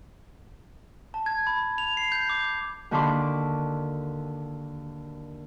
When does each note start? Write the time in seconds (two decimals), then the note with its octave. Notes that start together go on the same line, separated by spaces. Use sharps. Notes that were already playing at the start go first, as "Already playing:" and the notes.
1.14 A5
1.26 G#6
1.47 B5
1.78 F7
1.97 C7
2.12 G6
2.29 D6
2.91 D#2 D3 F#4 B5 C6 D6